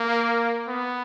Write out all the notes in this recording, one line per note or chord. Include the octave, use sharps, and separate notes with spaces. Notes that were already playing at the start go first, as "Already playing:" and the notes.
Already playing: A#3
B3